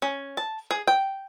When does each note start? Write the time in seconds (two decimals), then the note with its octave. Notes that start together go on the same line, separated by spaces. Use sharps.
0.02 C#4
0.37 A5
0.71 G#4
0.87 G5